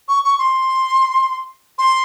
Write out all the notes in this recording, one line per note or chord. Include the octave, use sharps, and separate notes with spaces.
C#6
C#6
C6
C6